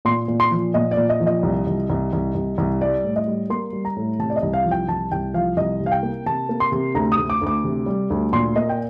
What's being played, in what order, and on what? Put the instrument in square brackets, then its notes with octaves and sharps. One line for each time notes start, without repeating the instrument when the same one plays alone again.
[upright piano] A#2 C6
A#2
C6
F3
A#2 D#5
D5
A#2
D#5
F3
D#5
C2
C2
C2
C2
C2
C2
G3 D5
A2
D#5
G3
A#3 C6
G3
A#5
A2
C3 A5
D5
D#5
C2
F5
F3
G5
C2 A5
C2 G5
F3 F5
C2 D#5
C3
F5
G5
A#3
C3 A5
A#3
C6
C3
D2 A#5
D#6
D2
D6
D2
D6
C3
G3
D2
A#2 C6
A#3 D#5
G5